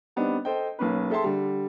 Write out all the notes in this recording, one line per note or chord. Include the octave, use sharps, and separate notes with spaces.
G3 B3 C4 D4 D#4
A4 C5 D#5 G5
B1 A#3 C#4 B4
G#4 A4 E5 G5 A5 C6
D3 G3